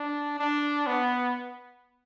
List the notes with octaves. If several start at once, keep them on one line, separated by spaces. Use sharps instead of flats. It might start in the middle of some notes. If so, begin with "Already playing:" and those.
Already playing: D4
D4
B3